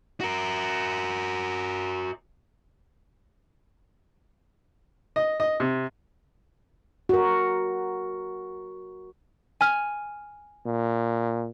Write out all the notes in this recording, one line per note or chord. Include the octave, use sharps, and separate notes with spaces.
F#4 A#4
D#5
D#5
C3
F#4 A#4
G#5 F6
A#2